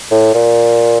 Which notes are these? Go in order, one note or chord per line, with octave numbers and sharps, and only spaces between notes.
A2
A#2